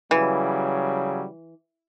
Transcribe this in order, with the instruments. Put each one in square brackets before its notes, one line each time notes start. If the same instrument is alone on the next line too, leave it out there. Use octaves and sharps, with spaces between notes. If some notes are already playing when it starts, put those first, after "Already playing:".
[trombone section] C#3 F#3 G3 [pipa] E3